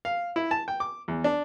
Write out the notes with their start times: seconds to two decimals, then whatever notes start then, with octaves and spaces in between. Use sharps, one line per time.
0.05 F5
0.36 E4
0.51 A5
0.68 G5
0.80 D6
1.08 E2
1.24 D4